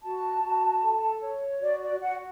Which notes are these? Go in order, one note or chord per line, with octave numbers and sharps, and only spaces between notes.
F#4 A5
F#4
A4
C#5
F#4 D5
D5
F#4 F#5